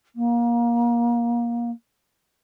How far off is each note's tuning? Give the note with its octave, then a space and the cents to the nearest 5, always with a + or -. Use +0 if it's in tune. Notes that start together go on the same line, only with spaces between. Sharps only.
A#3 +25